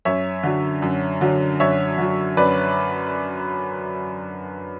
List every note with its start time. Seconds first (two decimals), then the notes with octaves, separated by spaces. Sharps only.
0.05 F#2 C#5 E5
0.43 D3 F#3
0.82 F#2
1.21 D3 F#3
1.60 F#2 C#5 E5
1.98 D3 F#3
2.37 F#2 B4 D5